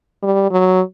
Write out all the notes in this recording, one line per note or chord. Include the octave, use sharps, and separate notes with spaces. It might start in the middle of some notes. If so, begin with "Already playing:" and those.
G3
F#3